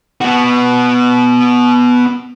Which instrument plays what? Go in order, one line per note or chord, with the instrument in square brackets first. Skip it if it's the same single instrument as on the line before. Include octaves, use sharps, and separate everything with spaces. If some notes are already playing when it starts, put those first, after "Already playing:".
[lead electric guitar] B3 F#4